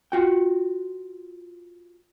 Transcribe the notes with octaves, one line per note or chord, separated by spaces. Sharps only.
F4 F#4 G5